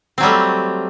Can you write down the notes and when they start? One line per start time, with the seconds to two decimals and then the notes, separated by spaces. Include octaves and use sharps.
0.18 C4
0.20 F#3
0.23 G3
0.26 A3